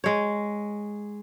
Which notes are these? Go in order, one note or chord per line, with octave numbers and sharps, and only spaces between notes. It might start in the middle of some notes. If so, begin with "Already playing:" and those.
G#3 C#5